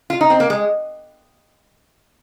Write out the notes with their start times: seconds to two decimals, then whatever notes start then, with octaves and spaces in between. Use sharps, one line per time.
0.10 F4
0.21 D#4
0.30 C4
0.40 A#3
0.50 G#3